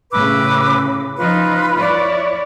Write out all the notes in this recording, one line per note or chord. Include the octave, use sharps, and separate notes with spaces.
A2 C#3 B4 D6 E6
F3 D#4 F4 B4
E4 C#5 D5